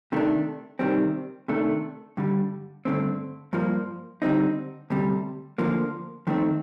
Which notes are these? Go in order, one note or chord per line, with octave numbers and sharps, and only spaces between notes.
C3 D#3 A3 D4
C3 D#3 G3 C4
C3 D#3 A3 D4
G2 D3 G3
G2 D3 A3 C4
G2 F3 A#3
D3 G3 C4 D#4
D2 C3 G3
D2 D3 F3 A#3
F2 D#3 A3 C4